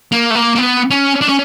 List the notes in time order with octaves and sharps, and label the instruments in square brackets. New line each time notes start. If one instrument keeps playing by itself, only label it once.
[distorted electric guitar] A#3
A3
A#3
A#3
B3
C#4
D4
C#4